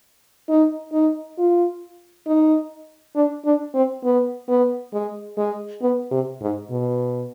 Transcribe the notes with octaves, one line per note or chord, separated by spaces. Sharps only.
D#4
D#4
F4
D#4
D4
D4
C4
B3
B3
G#3
G#3
B3
C3
G#2
B2